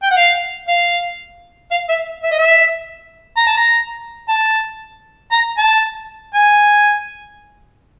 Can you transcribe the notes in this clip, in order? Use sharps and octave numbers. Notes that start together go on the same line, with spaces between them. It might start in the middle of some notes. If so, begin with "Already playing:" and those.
G5
F#5
F5
F5
F5
E5
E5
D#5
E5
A#5
A5
A#5
A5
A#5
A5
G#5